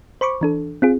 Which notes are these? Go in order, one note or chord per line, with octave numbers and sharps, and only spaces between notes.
C5 B5 C#6 D6
E3 D4 A4
C4 F4 G#4